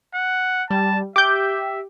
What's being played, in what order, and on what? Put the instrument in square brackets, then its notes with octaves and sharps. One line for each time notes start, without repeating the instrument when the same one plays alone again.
[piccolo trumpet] F#5
[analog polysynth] G3 [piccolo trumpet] A5
[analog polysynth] G4 [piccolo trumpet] E5 [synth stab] D6 G6